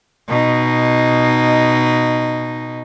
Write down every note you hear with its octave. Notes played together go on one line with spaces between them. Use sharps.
B2 D#4